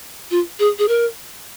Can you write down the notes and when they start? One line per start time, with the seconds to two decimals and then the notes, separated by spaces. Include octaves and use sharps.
0.31 F4
0.59 G#4
0.79 G#4
0.88 A#4